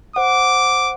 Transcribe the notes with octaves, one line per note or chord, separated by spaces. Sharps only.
C5 F#5 D6